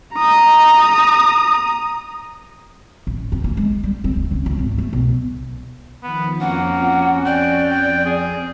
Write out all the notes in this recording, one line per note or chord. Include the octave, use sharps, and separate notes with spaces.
A#5 D#6
A1
F2
A#3
G#3
G3
C4
C#2
C#3
C#2
G#1
A3
B1
D#3 F3 B3
F2 F3 A#3 C4 C#4 F#4 F#5
D5 G5
G5
G#4